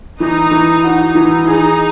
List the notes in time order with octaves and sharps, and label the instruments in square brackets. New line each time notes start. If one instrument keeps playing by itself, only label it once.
[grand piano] E3 [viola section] D#4
[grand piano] E3
[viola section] D#4 [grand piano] F#4
[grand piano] E3
[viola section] D#4 [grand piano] G#4